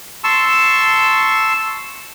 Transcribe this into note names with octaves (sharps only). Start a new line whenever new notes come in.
A5 C6 C#6 E6